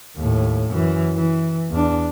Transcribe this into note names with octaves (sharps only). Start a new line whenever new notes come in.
D#2 A2
F#2 E3
E3
E2 D4